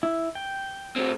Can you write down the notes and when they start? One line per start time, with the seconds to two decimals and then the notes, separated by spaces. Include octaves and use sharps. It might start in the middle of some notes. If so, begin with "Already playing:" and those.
0.03 E4
0.35 G5
0.96 A2 C4